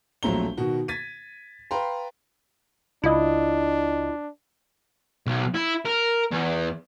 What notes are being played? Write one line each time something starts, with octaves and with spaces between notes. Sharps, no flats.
A#1 F#3 A3 C4 A#5 G7
B2 D#3 F#4
G#6 A6 B6 D#7
B4 F5 G5 A#5 C6
C#2 D4 E4 F4 D#5
B1
E4
A#4
E2